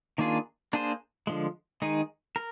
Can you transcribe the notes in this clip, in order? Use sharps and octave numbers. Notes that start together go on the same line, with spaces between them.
D#3 A#3 D4 F4 G#4
A#3 D4 G#4 C5
D3 F3 G#3
D#3 G#3 D#4 G#4
A#4